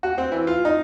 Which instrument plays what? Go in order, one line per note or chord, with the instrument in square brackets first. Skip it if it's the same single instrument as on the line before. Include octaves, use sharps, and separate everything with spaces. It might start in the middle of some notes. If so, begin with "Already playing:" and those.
[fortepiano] F#4
C4
E3
F4
D#4